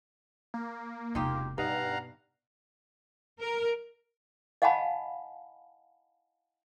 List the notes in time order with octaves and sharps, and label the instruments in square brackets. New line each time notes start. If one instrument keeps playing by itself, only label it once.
[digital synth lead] A#3
[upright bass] E1 C3 [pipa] D#4 F4 G4
[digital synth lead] G2 [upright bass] B2 [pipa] D#4 [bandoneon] F5 F#5 A#5
[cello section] A#4
[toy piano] D#5 F5 F#5 G#5 A5 B5